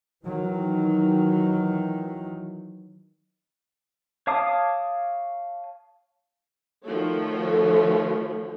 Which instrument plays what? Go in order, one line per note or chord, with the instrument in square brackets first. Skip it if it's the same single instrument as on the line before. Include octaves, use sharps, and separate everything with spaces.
[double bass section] D#3 E3 F#3
[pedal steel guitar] C#5 F5 A5 D6 D#6
[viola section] D#3 F3 A3 F#4 A4 C#5